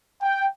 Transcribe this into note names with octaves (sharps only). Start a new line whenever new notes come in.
G5